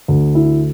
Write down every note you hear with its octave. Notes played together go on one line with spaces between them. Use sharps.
D2
E4